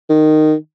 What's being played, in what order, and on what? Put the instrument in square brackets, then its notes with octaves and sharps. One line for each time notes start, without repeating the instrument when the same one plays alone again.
[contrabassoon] D#3